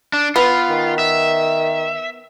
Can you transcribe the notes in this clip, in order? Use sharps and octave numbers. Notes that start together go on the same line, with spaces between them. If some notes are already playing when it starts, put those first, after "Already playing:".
D4
B3 F4
D#3
E5